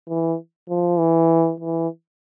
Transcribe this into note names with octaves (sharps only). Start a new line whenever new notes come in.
E3
F3
E3
E3